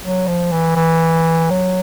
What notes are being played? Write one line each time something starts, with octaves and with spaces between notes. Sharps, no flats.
F#3
F3
E3
E3
F#3